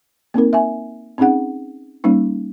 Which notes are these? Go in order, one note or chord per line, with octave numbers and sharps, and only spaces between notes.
A#3 C4 D#4 A#4
E5 G#5
C4 C#4 D#4 G#4 F#5
G3 A#3 C#4 D#4